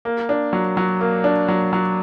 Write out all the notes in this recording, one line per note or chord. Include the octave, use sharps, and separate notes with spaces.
A#3
D4
F#3
F#3
A#3
D4
F#3
F#3